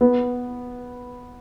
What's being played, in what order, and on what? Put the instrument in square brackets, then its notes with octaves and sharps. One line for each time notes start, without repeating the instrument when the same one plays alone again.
[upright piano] B3